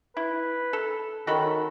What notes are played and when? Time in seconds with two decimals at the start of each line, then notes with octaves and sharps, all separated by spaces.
0.17 E4 B4
0.73 A4
1.27 D#3 C#4 F#4 A4 B5